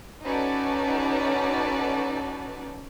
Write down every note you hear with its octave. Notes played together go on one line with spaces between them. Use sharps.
C#4 D#4 F#4 A4 B4 D5